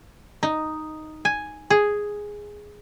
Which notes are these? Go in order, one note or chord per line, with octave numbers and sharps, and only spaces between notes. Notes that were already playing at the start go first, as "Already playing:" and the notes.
D#4
G#5
G#4